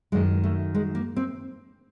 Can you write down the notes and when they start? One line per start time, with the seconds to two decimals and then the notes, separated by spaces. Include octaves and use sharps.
0.12 F#2 D#3 G#3
0.43 A3
0.75 G#3
0.95 A#3
1.17 C4